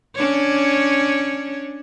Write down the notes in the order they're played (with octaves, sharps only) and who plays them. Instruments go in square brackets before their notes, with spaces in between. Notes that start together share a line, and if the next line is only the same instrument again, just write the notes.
[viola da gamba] C#4 D4 C#5